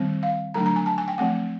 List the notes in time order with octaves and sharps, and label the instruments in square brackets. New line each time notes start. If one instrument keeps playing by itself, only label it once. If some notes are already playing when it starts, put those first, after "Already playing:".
Already playing: [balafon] D#3 G3 C4
F5
D3 F#3 A3 D4 A#5
A#5
G#5
A5
G#5
G5
F3 A3 C4 F#5